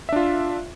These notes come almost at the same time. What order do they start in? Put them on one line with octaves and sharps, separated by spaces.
E5 D4 F4